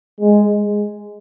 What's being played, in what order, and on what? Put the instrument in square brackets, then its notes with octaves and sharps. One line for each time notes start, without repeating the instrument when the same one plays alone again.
[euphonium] G#3